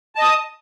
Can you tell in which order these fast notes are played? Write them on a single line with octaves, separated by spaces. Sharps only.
A5 D#5 D#6